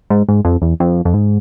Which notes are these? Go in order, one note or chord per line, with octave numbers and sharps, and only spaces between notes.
G#2
G#2
F2
E2
F2
F2
G#2